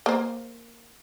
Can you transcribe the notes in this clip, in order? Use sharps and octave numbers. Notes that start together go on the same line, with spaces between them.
A#3 C5